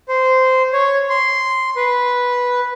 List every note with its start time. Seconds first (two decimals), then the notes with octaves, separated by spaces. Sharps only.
0.08 C5
0.73 C#5
1.09 C6
1.76 B4